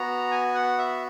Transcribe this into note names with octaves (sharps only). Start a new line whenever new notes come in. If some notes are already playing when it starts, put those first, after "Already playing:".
Already playing: B3 F#4 A#5
G#5
F#5
E5